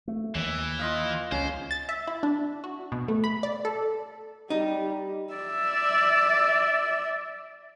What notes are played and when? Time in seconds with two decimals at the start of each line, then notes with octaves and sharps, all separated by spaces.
0.08 A3
0.35 D#2 E3
0.79 F4 D#5 F5
1.32 C#2 C#3 C#4 C5
1.71 A6
1.89 E5
2.07 E4
2.23 D4
2.64 F#4
2.92 B2
3.08 A3
3.24 B5
3.43 D5
3.65 A4
4.50 G3 D#4
5.33 D5 E5